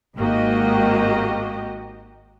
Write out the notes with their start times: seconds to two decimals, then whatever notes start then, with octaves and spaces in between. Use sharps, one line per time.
0.16 G#1 G#2 A#3 F#4 G4 D#5